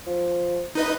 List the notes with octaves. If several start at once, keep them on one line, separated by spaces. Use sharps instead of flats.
F3
D#4 B4 D#5